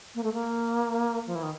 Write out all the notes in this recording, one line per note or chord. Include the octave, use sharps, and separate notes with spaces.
A#3
A3
A#3
F3
E3
D#3